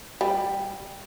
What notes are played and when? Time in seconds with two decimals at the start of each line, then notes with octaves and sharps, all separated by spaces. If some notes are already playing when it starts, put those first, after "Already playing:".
0.21 G3